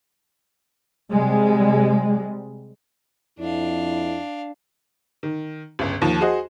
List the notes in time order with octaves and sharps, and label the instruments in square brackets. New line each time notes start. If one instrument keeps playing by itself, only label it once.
[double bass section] C3 G3 G#3
[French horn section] F2 E4 [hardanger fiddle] D4 F5
[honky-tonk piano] D#3
G1 C#2
D#2 F3
F#4 G#4 C5 D#5